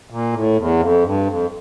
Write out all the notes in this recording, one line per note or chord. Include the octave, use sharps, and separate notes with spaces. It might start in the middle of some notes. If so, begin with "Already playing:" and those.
A#2
A2
E2
F2
G2
F2